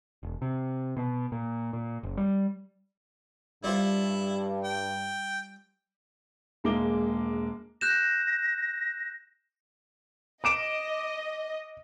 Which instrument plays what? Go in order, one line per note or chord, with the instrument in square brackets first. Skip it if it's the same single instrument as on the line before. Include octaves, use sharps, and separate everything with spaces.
[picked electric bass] E1
C3
B2
A#2
A#2
F#1
G3
[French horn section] G2 [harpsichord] G3 F4 C5 [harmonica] E4
[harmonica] G5
[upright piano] E1 G#3 A#3 E5 D6 G7
[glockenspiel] F#6 G6 E7 [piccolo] A#6
[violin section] D#5 [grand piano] D6 D7 E7